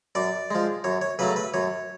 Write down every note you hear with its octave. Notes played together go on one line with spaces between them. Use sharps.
F#2 D5
F3 G#3
F#2 C#5
C#5
C#3 F#3 A3 B4
B4
F#2 C#5